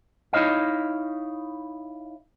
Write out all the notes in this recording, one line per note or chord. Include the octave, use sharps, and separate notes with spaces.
D#4 E4 C#5 D#5 F5